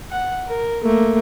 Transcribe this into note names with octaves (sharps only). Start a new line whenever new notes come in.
F#5
A#4
A3 A#3